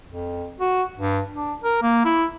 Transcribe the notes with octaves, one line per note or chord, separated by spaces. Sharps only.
F2
F#4
G2
D4
A#4
A#3
E4